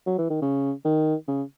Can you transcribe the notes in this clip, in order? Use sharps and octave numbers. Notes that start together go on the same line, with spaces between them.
F#3
E3
D#3
C#3
D#3
C#3